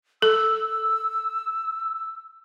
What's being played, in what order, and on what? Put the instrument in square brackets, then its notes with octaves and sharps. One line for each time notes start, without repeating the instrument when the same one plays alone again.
[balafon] A4 [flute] E6